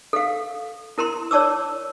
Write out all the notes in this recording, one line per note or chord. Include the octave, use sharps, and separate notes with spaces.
A4 F5
E4 A#4 A#5 C6
C#5 D5 A5 D6 E6